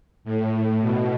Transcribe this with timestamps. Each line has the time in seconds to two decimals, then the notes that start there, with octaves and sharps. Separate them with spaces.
0.25 A2
0.81 B2